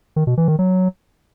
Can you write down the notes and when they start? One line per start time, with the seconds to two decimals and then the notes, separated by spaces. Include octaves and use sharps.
0.16 D#3
0.27 B2
0.37 E3
0.48 D#3
0.59 F#3